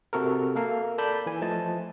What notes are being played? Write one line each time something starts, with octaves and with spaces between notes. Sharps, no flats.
C3 F#4 A4 A#4
A#3 A4 A#4 F5
A4 D5 A5 B5 G6 A6
E3 G#5
F3 A3 D#5 A5